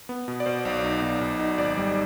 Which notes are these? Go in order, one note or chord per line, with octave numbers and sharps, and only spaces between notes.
B3
B2
D5
B2 C5
B1
D#4
B1
B1
D#4
G#1 D5
G3